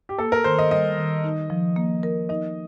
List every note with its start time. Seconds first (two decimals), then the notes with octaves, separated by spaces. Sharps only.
0.09 G4
0.18 A#3 A4
0.32 A#4
0.44 D#3 C5
0.59 D#5
0.71 G3 D#5
0.98 D#3
1.24 D#4
1.50 F3
1.76 A#3
2.03 A#4
2.29 D#4 D#5